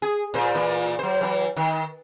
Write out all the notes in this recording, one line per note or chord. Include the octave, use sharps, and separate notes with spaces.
G#4
A#2 C5
A#2 E3
F#3 C5
E3 F#3
D#3